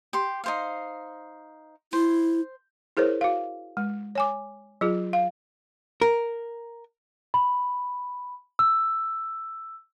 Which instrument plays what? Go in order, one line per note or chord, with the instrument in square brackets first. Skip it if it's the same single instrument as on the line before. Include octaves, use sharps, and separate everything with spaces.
[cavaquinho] G4 C6
D#4 C5 F5
[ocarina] E4 [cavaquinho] C5
[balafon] E4 G#4 A#4 C5 C#5
F#4 F5
G#3
C#5 G#5 D6
F#3 F4 G#4
F5
[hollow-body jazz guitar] A#4
[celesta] B5
E6